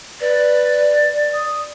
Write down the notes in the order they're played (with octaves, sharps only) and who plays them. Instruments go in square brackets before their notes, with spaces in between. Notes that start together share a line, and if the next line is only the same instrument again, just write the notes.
[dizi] B4 [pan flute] D5
[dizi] D#6